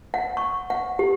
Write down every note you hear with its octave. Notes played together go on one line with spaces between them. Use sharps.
F#5
C#6
F#5
G4